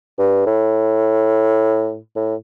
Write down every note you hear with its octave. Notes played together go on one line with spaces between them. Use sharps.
G2
A2
A2